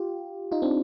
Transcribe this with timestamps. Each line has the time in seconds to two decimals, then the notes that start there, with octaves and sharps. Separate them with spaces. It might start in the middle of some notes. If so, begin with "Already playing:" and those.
Already playing: F4 G4
0.52 D#4 F4
0.62 C4 D4